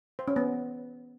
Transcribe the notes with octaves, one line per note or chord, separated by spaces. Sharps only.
C5
C#4
B3